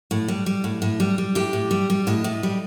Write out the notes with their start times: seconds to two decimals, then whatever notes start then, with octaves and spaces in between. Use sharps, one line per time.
0.11 A2
0.28 G3
0.46 G3
0.64 A2
0.82 A2
1.00 G3
1.18 G3
1.35 A2 G4
1.53 A2
1.71 G3
1.90 G3
2.07 A2 D#5
2.24 A2
2.43 G3